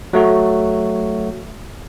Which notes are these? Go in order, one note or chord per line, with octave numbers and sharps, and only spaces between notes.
F#3 A3 F#4